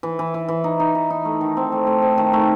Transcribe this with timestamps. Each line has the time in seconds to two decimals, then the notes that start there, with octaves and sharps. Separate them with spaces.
0.03 E3
0.19 E3
0.34 E3
0.48 E3
0.64 D#4
0.80 D#4
0.95 E3
1.10 D#4
1.25 A3
1.41 D#3
1.57 C4
1.72 A3
1.87 A3
2.02 C4
2.18 D#3
2.33 A3